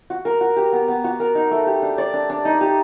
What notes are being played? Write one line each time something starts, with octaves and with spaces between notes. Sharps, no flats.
F#4
A#4
F#4
G4
B3
B3
F#4
A#4
D#4
A3
G4
D4
D5
D4
D4
D#4
G4